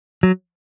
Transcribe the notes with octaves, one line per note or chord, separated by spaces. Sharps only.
F#3